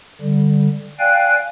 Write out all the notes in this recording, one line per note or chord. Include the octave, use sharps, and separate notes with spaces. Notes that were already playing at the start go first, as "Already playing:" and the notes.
D3 G3
D5 F5 G5 G#5 F#6